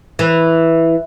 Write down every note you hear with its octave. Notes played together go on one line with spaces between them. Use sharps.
E3